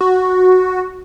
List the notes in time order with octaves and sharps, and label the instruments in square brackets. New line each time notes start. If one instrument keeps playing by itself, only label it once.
[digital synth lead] F#4